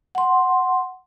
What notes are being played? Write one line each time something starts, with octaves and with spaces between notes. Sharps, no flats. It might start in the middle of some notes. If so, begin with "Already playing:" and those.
F#5 C6